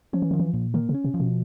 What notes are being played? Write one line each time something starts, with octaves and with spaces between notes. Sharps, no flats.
F3 C#4
E3
D#3 F3
E3
A#2
D#3 A#3
C#3
C#4
C3
F3
B2